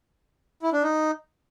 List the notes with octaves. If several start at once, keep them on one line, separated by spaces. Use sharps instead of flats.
E4
D4
D#4